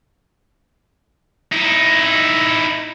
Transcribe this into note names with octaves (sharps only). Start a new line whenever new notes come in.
D#4 E4